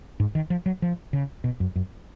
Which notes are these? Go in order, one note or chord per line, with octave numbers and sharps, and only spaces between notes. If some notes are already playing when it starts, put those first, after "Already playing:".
G#2
D#3
F3
F#3
F3
C#3
B2
F#2
F#2